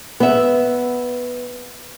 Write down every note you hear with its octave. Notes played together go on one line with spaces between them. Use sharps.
B3 E5